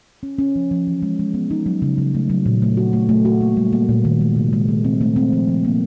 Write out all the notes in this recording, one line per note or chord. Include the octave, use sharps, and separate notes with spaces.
C#4
C#4
F3
F3
E3
G#3
G#3
B3
D#4
F#3
C#3
C#3
A3
F#3
A#2
A3
F#4
A3
A3
F#4
A#3
G3
A#3
A#2
D#3
G#3
C3
G#3
A3
C4
A3
C4
F3
F3
A#3